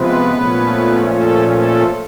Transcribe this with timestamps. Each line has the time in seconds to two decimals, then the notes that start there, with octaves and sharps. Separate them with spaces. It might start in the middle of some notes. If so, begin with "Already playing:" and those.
Already playing: C3 F3 G#3 B3 B4
0.32 A#2 F3 A3 C#4
1.09 A3 A4
1.48 A3 A4